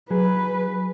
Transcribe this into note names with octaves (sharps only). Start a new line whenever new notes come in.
F#3 G#4 B4